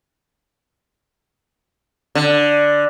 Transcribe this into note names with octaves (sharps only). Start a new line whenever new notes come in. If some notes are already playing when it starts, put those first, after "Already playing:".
D3